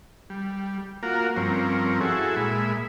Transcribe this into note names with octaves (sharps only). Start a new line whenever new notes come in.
G3
A#3 F4 F#4 A#4
G2 F3 C4 C#4 A#4
E4 F#4 G#4 A4
A#2 G#3 E5 B5